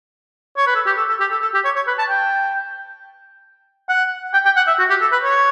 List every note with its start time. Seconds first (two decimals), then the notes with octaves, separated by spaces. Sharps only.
0.58 C#5
0.67 B4
0.75 A4
0.86 G4
0.98 A4
1.09 A4
1.20 G4
1.31 A4
1.42 A4
1.54 G4
1.65 C#5
1.76 C#5
1.87 B4
1.99 A5
2.09 G5
3.89 F#5
4.34 G5
4.45 G5
4.56 F#5
4.67 E5
4.79 F#4
4.90 G4
5.01 A4
5.12 B4
5.24 C#5